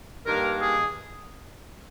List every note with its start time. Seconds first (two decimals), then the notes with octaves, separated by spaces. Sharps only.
0.25 G2 D#3 A#3 A#4
0.61 G#4